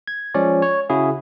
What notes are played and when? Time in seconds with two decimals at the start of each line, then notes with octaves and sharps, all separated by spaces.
0.07 G#6
0.34 F3 G#3 C#4 C#5 D5
0.62 C#5
0.90 C#3 E4 F#4 G#4